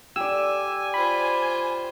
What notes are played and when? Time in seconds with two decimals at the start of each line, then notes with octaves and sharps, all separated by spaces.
0.16 G4 D5 G#5 E6
0.94 F4 C5 B5